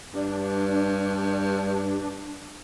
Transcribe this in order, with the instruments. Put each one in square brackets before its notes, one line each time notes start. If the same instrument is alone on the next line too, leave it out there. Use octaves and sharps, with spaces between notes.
[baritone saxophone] G2 [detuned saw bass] D4